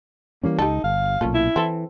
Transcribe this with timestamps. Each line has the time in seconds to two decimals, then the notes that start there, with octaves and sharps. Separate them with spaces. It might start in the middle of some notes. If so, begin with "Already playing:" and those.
0.43 E3 G3 A#3 C#4
0.59 C#2 D#4 G4 A4
0.84 G1 F5
1.21 B1 A#2 C#4 F4 A4
1.34 E4
1.56 E3 C4 A4